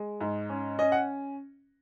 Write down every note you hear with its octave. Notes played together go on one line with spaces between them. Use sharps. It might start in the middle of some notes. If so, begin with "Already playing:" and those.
Already playing: G#3
G#2
C#4
C#4 D#5
F#5